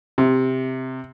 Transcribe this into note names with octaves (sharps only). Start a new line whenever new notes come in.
C3